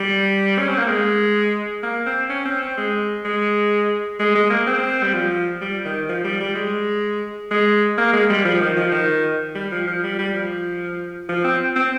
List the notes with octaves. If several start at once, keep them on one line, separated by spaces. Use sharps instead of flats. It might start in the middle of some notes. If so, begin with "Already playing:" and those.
Already playing: G3
C#4
C4
A#3
G#3
A#3
C4
C#4
C4
C4
G#3
G#3
G#3
G#3
A#3
C4
G3
F3
G3
D#3
F3
G3
G3
G#3
G#3
A#3
G#3
G3
F3
D#3
F3
D#3
G3
F3
F3
G3
G3
F3
F3
C4
C4